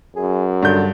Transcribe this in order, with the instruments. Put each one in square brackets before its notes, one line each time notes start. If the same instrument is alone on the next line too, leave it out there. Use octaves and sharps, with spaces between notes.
[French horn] F#2 [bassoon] G#4
[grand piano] G2 G6 [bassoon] D3